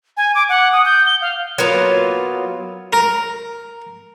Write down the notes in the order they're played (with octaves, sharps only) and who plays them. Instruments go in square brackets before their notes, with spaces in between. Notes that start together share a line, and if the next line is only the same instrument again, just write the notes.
[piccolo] G#5
D6
F#5
D#6
G6
G7
F5
[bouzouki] F#3 A#3 B3 F4
[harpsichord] A#4